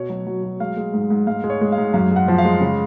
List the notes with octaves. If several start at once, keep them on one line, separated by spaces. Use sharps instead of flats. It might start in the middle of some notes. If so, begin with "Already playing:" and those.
Already playing: B2 C#5
F#3
F#3
F#3
G#3 F5
G#3
G#2
G#2
G#2 F5
G#3
C#5
G#3
F5
G#2
F#2 F5
G#3
F#5
F3
F5
G#3
C#3